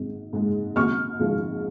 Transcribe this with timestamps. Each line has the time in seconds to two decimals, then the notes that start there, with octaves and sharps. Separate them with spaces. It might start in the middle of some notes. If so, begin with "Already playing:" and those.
Already playing: G#1 G#2
0.33 G#2 G#3
0.76 G#1 C#6 F6
1.19 G#2 F3 G#3